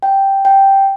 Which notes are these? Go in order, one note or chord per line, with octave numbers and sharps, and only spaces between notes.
G5
G5